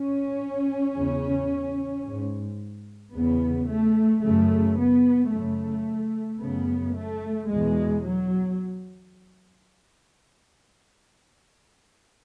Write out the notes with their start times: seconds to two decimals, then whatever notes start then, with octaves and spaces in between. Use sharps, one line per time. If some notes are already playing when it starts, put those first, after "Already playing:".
Already playing: C#4
0.95 E2 C#3
2.04 G#2
3.14 E2 C#3 B3
3.68 A3
4.22 F#2 C#3 A3
4.77 B3
5.31 F#2 C#3 A3
6.41 F#2 C#3 B3
6.95 A3
7.50 E2 B2 G#3
8.05 F#3